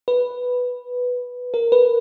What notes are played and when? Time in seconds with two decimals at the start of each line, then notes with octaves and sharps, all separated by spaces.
0.08 B4
1.54 A#4
1.72 B4